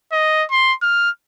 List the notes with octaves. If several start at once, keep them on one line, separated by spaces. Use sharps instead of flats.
D#5
C6
F6